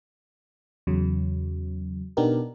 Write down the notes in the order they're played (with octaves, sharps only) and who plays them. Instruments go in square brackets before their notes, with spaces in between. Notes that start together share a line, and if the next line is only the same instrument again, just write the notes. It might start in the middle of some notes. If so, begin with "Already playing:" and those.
[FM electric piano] E2 C#3 F#3
B2 B3 D4 D#4 G4 A#4